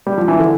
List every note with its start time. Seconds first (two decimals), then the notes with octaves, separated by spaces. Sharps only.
0.07 G3
0.18 F3
0.28 E3
0.39 D3